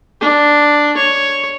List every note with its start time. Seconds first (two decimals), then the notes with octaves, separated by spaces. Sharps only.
0.21 D4
0.97 C#5